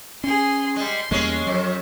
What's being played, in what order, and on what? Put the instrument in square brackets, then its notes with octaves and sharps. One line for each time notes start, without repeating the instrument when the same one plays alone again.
[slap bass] C#4 [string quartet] G#4 C6
[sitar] G3 G#3 [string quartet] C6
[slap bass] E2 G3 A#3 [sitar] G#3 C#4
[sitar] F2 [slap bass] F#3